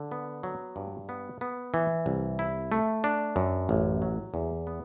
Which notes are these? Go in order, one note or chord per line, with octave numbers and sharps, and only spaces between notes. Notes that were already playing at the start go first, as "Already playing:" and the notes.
Already playing: D3
B3
F#3
G2
B3
B3
E3
C2
E4
A3
D4
F#2
A1
F#3
E2
B3